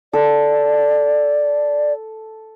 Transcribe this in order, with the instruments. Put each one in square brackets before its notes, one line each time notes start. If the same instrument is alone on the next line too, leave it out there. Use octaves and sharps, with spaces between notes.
[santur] A4 [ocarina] D5